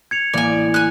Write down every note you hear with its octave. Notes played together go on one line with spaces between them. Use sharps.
G#6 C#7 F7
A1 A#3 D5 G#5
G#5 F#6